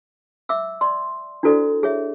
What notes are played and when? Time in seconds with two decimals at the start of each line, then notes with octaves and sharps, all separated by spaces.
0.49 E5 D6 E6
0.81 D5 C6
1.43 D4 E4 F#4 A4 C5 D5
1.83 G#4 C#5 E5